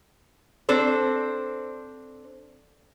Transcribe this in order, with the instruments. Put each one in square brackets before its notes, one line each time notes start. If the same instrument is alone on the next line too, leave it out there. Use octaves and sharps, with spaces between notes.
[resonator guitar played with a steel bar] C4 D4 A4 C5